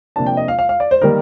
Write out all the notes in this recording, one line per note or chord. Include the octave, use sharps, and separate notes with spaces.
C3 F3 A#3 D4 A5
G5
D#5
F5
F5
F5
D5
C5
D#3 G3 A#3 D#4 A#4